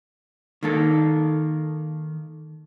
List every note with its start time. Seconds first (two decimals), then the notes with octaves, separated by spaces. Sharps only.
0.63 D#3 A#3 A4